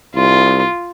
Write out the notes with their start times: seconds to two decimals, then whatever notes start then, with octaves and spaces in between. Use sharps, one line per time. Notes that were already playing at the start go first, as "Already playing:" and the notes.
0.15 C2 F4